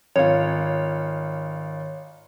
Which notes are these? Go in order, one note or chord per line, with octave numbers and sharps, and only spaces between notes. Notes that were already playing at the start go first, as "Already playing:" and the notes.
G#1 F4 C#5